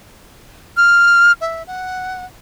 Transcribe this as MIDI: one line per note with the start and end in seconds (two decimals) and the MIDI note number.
0.77 1.32 89
1.41 1.63 76
1.67 2.25 78